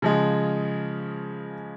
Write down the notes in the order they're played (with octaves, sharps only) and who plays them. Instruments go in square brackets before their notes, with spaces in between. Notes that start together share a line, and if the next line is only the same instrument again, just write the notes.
[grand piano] C#3 F3 G#3